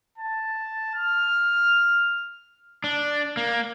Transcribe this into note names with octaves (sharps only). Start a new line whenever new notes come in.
A5
F6
D4
A#3